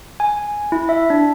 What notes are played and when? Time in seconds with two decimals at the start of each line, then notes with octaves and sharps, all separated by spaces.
0.20 G#5
0.72 E4
0.89 E5
1.10 D4